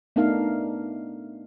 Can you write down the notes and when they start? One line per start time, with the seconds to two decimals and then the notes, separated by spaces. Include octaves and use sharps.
0.16 A3 B3 D4 D#4 A#4 F5